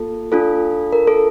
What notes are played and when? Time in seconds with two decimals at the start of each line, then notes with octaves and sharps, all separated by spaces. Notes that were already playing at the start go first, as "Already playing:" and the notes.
Already playing: A#3 F4 A4
0.32 D4 F4 A4
0.93 A#4
1.07 A4